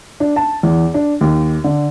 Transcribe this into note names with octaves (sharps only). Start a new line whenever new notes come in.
D4
A5
E2
D4
D#2
D3